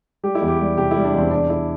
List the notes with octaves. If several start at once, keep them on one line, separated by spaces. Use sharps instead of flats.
G3 G4
E4
E2
G4
G3
C3 G4
G3 E4
D4
E2
C4
C3 D4
C3 E4